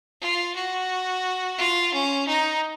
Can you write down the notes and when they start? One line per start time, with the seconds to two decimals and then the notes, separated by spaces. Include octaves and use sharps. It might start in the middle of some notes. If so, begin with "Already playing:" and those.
0.21 F4
0.56 F#4
1.58 F4
1.94 C#4
2.28 D#4